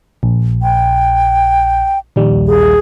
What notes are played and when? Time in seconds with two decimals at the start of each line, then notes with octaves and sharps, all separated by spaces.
0.23 A#1
0.63 G5
2.16 A#1 D#2 G3
2.47 G#4